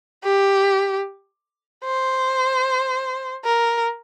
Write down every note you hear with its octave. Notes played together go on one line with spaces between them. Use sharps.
G4
C5
A#4